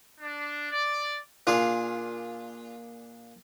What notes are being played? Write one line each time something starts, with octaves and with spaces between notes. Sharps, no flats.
D4
D5
A#2 D4 F4 G#4